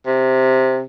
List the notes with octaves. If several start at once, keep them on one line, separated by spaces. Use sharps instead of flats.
C3